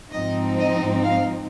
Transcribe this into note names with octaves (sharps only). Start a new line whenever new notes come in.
G#2 F3 C4 D#4 D#5
D#5
F5